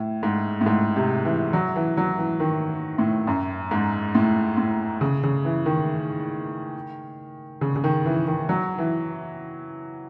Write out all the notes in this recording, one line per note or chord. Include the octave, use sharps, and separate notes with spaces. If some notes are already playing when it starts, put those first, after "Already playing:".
Already playing: A2
G#2
A2
G#2
C3
E3
F#3
E3
F#3
E3
D#3
A2
F#2
G#2
A2
A2
C#3
C#3
E3
D#3
C#3
C#3
D#3
E3
D#3
F#3
E3